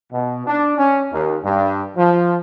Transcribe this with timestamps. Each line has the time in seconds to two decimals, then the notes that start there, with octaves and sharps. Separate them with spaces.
0.13 B2
0.47 D4
0.78 C#4
1.12 D#2
1.44 G2
1.97 F3